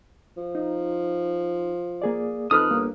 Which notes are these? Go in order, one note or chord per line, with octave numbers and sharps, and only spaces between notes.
F3
D#4
A#3 G#4 D5
F2 D#4 A4 B4 D#6 F6 F#6
G1 A#3